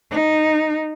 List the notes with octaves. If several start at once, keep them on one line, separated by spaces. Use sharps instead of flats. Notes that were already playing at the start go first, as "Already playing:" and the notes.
D#4